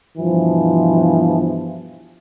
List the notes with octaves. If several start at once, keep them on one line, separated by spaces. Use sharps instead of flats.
G2 B2 E3 F3